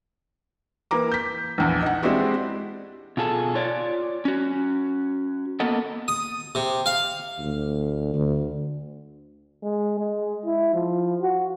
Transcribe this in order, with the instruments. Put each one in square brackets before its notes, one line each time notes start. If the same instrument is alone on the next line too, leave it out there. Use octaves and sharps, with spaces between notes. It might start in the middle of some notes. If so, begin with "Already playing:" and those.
[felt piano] E3 A#3 A#5 D6
G6 B6
A#1 E2
D#4 F#5
G#3 C4 D4 E4 F#4 G4
[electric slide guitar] B2 F4 G#4 A4
F4 C#5 D5
C#4 F#4
A#3 B3 A4 D#5 F#5
[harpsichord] D#6
C3
F5
[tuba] D2
D2
[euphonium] G#3
G#3
E4
F3
F#4